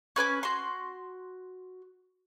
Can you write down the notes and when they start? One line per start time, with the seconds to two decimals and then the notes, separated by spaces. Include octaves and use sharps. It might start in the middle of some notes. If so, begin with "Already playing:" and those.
0.16 C#4 B4 G#5 D6
0.43 F#4 C6